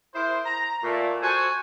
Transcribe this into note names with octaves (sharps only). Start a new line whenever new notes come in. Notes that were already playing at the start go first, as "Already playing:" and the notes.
E4 G#4 A#4 C5
A#5
A#2 A3
F#4 A4 C5 G#5